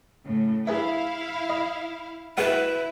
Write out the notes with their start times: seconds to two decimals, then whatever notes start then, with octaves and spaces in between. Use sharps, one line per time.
0.24 A2 C#3
0.67 E4 G#4 B4 E5 F5
1.50 D#5
2.38 G#3 B3 E4 F#4 B4